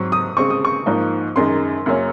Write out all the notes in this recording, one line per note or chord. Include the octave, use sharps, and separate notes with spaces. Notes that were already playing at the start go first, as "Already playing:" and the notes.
Already playing: G#2 F#3 C4 C#6
D#6
C#3 G#3 C4 C#6
D#6
C#6
G#2 F3 A#3 D#4
F#2 D#3 G#3 D#4 C6
F#2 C#3 F#3 A#3 C#4